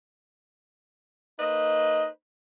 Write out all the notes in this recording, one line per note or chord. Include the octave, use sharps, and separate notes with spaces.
A#3 D#4 B4 C5 D#5